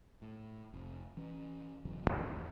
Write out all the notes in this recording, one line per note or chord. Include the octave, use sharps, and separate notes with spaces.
A2
F1
E3 C#4
E1 C#3 E3 F#3
E2 A2 D#3 E3